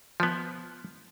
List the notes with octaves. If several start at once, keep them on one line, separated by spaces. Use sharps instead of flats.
F3 B3